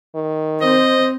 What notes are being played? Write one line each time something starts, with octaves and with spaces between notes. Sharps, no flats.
D#3
C4 C5 D#5